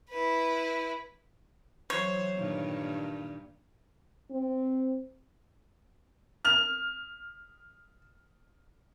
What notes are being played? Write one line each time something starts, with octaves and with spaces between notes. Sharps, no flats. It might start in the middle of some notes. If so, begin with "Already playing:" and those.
E4 B4
E3 F#3 C5 C#5
G2 A#2 D#3
C4
F6 F7